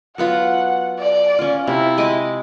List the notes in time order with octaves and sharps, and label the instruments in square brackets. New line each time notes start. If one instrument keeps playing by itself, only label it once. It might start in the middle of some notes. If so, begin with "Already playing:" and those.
[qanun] F#3 B3 F4 [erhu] F#5
[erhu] D5
[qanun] C#4 F4
[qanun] C3 [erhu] E4
[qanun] G#3 D#5 D6